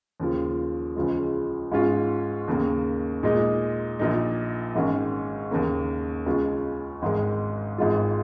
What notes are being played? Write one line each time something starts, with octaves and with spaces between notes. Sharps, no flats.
D#2 C#3 F3
C#2 C#3 F3 G#3
G#2 G#3 C#4 F4
D#2 C#3 A#3
A#2 G#3 D#4
A#1 A#2 A#3 D#4
G#1 G#2 D#3 C#4
D#2 C#3 A#3
C#2 C#3 G#3 C#4 F4
G#1 G#2 D#3 G#3
G#1 G#2 G#3 F4